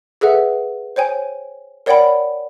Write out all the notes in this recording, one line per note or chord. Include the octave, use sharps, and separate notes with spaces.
G#4 A4 B4 E5 F#5
C5 C#5 G5 G#5
A#4 C#5 D5 F#5 G5 B5